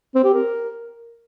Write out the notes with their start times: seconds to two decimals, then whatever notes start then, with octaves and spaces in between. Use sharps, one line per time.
0.15 C4
0.24 G4
0.34 A#4